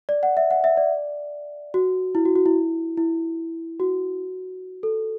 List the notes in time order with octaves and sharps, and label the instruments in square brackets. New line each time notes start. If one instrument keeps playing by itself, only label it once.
[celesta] D5
F#5
E5
F#5
E5
D5
F#4
E4
F#4
F#4
E4
E4
F#4
A4